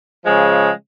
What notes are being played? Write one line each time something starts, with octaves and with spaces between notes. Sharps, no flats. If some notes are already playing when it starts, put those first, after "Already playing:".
C#3 F3 G#3